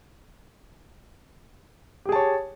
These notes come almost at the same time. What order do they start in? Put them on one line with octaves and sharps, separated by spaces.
G4 G#4 A5 C#5